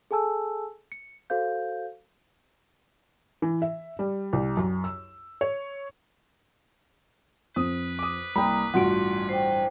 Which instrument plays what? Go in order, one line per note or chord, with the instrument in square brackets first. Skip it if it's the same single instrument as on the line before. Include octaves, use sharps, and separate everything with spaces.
[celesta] G#4 A4 G#5 A5 E6
C#7
F#4 A4 C5 F5 G6
[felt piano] E3
E5
G3
C2
F#2
E6
C#5
[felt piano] F2 [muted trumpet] B4 [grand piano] D#6
[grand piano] D6 D#6
[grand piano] C2 [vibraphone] A#3 A#5 D#6 [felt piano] G5 B5
[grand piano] A1 G2 D7 [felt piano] F4 F#4 F#5 [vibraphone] C6
[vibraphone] C5 G5